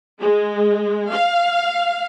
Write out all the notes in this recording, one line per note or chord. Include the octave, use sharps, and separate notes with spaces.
G#3
F5